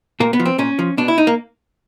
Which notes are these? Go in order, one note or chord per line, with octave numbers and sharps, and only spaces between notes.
A#2 A#3
B3
F3
C4
A#2 C#4
F3
B2 D4
E4
D#4
A#3